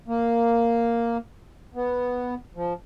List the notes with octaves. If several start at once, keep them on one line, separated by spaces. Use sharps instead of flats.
A#3
B3
F3